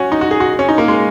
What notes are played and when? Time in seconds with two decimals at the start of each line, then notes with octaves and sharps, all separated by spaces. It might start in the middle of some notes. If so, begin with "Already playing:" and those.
Already playing: C#4 F#4
0.12 D#4
0.21 F#4
0.31 G#4
0.40 F#4
0.59 C#4
0.69 D#4
0.78 A#3
0.88 G#3